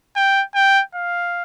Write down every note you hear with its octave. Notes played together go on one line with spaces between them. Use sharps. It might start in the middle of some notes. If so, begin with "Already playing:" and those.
G5
G5
F5